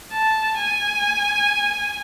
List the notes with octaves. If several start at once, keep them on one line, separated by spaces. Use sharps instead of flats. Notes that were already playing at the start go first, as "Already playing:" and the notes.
A5
G#5